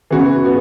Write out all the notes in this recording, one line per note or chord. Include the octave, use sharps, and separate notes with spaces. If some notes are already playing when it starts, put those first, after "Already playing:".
C#3 E3 B3 F#4
B3 F#4